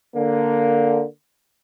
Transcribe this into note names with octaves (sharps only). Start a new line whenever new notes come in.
D3 A#3